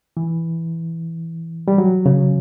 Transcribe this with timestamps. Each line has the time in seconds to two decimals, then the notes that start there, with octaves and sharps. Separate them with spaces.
0.17 E3
1.68 G3
1.78 F#3
2.06 C#3